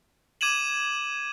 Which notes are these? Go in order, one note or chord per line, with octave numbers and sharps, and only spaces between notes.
D6 G#6 D#7 E7 F#7